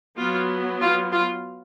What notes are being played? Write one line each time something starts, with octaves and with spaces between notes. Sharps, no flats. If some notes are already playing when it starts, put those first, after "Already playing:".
F#3 B3 F4
F4
F4